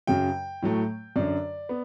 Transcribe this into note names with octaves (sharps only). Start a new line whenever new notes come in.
F#2 C#3 F#3 G5
A2 F#3 A3
F#2 D3 F#3 D5
B3